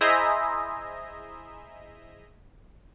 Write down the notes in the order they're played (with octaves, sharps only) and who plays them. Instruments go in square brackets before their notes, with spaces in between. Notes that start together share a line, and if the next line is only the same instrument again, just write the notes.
[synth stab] E4 G#4 C5 D#5 E5 A#5